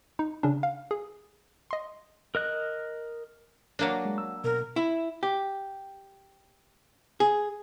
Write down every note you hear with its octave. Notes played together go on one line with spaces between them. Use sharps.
D#4
C#3 C#4 D4
F5
G#4
D#5 C6
A#4 D#5 F#6
F#3 A#3 D4
G#3
E6
B2 A#4
E4
G4
G#4